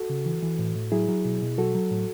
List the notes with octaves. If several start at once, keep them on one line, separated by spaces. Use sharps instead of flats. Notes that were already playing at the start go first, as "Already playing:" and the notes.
Already playing: F#4 A4
C#3
E3
E3
A2
A2
F#3 E4 G#4
F#3
B2
B2
F#3 F#4 A4
F#3
A2